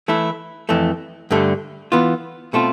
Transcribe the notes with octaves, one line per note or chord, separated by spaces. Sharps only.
E3 A3 E4
F2 E3 A3
G2 D3 A3
E3 B3 F4
B2 A3 C4 F4